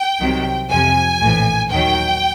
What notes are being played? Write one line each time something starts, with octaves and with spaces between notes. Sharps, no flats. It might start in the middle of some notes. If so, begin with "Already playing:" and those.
Already playing: G5
C2 C3 D#3 F#3
F2 C3 F3 G#5
A#1 A2 E3
D#2 D#3 F#3 G5